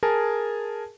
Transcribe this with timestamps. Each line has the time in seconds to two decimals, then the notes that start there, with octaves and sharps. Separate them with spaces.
0.03 G#4 A#4 G#5 A5